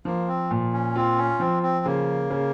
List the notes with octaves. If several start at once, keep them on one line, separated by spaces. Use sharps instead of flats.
F3 A#3
C4
A#2
C#4
C4 F4
C#4
F3 C4
C4
C#3 A#3
C#3